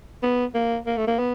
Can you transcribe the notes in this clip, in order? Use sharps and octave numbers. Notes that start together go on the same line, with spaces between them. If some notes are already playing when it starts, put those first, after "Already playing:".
B3
A#3
A#3
A3
A#3
B3